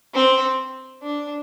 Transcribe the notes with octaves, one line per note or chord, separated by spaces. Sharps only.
C4
D4